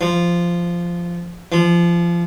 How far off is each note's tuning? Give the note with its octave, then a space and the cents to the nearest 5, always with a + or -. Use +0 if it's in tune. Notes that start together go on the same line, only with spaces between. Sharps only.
F3 -10
F3 -25